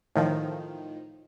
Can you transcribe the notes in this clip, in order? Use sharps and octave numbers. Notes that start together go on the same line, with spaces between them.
A2 D#3 F3